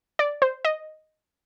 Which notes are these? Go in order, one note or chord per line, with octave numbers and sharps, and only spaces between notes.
D5
C5
D#5